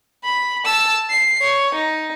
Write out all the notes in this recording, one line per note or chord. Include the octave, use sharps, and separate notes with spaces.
B5
A5 E6
C7
C#5
D#4